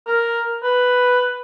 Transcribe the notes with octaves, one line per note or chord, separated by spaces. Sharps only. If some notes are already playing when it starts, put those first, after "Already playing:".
A#4
B4